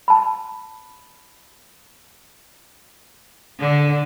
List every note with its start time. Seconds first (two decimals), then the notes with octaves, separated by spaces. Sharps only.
0.08 A5 B5
3.59 D3